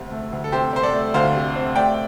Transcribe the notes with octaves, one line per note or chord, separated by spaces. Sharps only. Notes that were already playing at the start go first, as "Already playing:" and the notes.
Already playing: D2 C3 A3 C4
A3
D2
A4
C3 G4 C5
C4 C5
A4 D5
A3
D2 C5 F5
C3
C4
A3 D5 G5